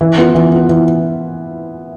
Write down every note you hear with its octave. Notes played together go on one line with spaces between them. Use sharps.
E3
B3 F4
E3
B3 F4
E3